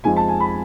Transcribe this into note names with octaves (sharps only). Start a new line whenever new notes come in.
F2 F3 G#3 G#5
A5
G#5
B5